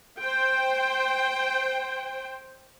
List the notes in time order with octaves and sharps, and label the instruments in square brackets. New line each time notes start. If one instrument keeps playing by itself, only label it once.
[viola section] C5 G5